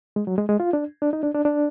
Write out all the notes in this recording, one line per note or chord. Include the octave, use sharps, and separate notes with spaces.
G#3
F#3
G#3
G#3
F4
D4
D4
D#4
D4
D4
D4